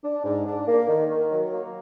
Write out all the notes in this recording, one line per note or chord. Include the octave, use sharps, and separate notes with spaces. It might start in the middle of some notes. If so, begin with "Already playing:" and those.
D4
G#2
D4
A#3
D#3
D#3
F#3
A#3